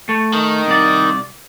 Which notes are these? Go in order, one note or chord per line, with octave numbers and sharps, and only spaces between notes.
A3
D#3
C2 D5